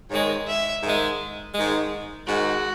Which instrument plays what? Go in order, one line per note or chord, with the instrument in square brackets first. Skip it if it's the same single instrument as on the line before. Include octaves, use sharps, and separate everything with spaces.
[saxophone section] G#2 D#3 G#3 [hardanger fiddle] C#5
[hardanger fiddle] E5
[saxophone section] G#2 D#3 G#3
G#2 D#3 G#3
[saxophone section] G#2 D#3 G#3 [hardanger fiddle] F#4